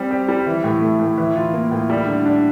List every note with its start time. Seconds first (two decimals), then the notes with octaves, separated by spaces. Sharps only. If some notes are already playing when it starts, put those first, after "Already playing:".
Already playing: G3 C4
0.11 G4
0.29 G3
0.46 E3
0.64 A2
0.82 A3
1.00 A2
1.18 E3
1.36 F4
1.54 A#3
1.71 A2
1.90 G3
2.07 D3
2.26 D4